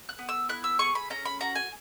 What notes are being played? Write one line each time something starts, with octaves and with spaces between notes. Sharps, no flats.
F#6
B3
E6
E4 F#6
E6
G#4 C#6
B5
C#4 A#5
B5
F#4 A#5
G#5